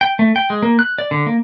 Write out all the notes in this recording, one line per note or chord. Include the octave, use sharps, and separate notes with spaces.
G5
A3
G5
G#3
A#3
F#6
D5
D3
A#3